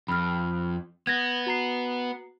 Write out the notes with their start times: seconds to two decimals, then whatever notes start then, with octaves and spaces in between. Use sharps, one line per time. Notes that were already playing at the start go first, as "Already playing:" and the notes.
0.08 F2 B5 F6
1.07 B3 G#6 A#6
1.46 F#4 A#5 C7